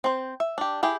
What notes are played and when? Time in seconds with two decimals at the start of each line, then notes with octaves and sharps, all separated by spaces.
0.04 C4 C5
0.40 E5
0.58 D4 G4
0.83 E4 G4 G#4 G5